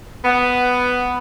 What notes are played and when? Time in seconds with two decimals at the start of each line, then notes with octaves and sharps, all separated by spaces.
0.24 B3